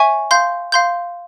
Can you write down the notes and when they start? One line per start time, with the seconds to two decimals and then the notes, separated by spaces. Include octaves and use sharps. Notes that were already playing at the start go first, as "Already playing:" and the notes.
Already playing: C#5 E5 G#5 C#6
0.31 F5 C6 G6
0.72 F5 C6 G6